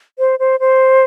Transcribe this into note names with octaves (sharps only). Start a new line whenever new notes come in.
C5
C5
C5